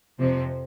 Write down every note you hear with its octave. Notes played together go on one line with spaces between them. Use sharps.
F2 C3 F3 C4